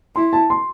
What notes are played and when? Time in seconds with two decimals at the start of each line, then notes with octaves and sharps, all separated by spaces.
0.16 E4 C6
0.33 A5
0.50 C6